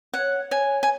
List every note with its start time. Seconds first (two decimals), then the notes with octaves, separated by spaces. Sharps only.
0.14 C#5 F#5
0.51 C#5 G#5
0.83 G#5